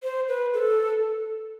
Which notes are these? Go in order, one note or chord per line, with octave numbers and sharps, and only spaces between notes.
C5
B4
A4